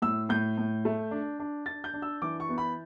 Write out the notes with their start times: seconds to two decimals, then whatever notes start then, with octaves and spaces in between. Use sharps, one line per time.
0.02 A2 E6
0.29 A2 G6
0.58 A2
0.85 A3
1.11 D4
1.40 D4
1.66 D4 A6
1.84 G6
1.94 D4
2.02 E6
2.22 E3 D6
2.40 C#6
2.49 B3
2.58 B5